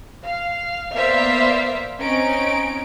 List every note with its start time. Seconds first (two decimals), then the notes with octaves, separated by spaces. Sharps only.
0.25 F5
0.96 A#3 B3 C5 D5 E5 F5
2.00 C4 C#4 D#4 D7